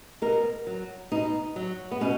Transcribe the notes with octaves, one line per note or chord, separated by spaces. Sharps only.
B2 A#4
F#3
B2 D#4
F#3
B3
B2 C#4